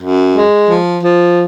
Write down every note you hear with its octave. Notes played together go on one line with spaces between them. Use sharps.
F#2
G#3
F3
F3